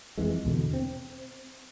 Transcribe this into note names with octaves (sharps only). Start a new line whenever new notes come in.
F2 E3 G#3
E2 B2 D3
C4